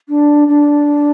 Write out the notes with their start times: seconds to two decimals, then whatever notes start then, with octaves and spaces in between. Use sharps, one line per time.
0.09 D4
0.48 D4